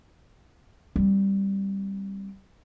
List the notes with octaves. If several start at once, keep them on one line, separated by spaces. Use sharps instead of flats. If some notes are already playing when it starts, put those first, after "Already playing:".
G3 C4